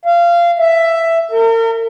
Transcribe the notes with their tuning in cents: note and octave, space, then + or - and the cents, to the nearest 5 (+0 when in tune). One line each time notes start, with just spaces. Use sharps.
F5 -20
E5 +5
A#4 -40